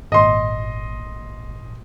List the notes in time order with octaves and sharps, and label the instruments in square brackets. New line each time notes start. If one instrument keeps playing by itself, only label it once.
[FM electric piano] G#1 A#2 [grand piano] D#5 C6